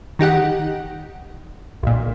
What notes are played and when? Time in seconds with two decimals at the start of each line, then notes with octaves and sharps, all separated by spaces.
0.19 D#3 D#4 G4 F#5
1.83 B1 A#2